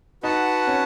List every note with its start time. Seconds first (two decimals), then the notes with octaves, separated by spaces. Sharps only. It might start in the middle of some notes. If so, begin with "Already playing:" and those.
0.23 D#4 F#4 B4 F#5 A5
0.67 C#4